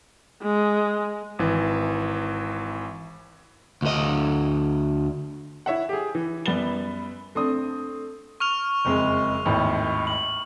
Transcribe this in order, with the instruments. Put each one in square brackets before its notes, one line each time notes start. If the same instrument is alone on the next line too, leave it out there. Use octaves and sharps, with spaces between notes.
[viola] G#3
[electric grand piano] G#1 E3
[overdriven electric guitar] D2 D#5
[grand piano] E4 C#5 E5 F#5
G4 G#4
E3
F#2 G3 B3 B5 A6 G7
A3 C4 D4 D#6
[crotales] C#6 F6 F7
[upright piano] F#1 F2 G#3
G#1 D#2 A2
[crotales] F#7